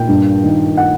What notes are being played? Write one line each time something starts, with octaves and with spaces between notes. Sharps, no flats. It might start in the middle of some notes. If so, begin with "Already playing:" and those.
Already playing: A#2 G5
G2
D#3
F#5